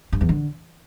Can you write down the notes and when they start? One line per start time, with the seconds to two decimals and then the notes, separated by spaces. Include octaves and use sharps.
0.13 G2
0.21 E2
0.29 D3